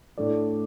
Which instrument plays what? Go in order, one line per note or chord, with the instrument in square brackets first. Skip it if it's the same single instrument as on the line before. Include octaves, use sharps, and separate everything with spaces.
[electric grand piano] A2 A3 D4 A4 D5